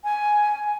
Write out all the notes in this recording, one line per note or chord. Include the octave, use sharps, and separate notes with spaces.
G#5